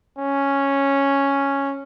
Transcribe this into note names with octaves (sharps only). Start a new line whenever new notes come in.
C#4